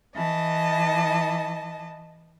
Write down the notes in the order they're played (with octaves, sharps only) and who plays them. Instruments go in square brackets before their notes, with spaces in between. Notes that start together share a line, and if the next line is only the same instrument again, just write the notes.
[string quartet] E3 D#5 A5